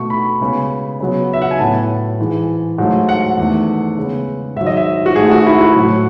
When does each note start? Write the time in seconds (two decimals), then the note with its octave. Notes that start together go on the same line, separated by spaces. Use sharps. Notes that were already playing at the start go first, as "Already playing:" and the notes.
Already playing: B2 A3 C#6
0.10 B5
0.41 C#3 G#3 B3
1.00 C#3 F#3 B3
1.33 E5
1.42 F#5
1.51 G#5
1.59 A2 F#3 B3 A5
2.19 G#2 E3 G#3
2.78 G#2 F#3 A3
3.09 F#5
3.37 E2 D#3 A3
3.98 C#3 G#3 B3
4.56 G#2 D#3 F#3 E5
4.67 D#5
4.77 E5
5.06 F#4
5.16 G#2 D#3 A3 G#4
5.31 F#4
5.46 E4
5.61 F#4
5.76 A2 F#3 A3